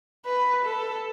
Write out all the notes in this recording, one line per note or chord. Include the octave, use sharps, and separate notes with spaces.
B4
A4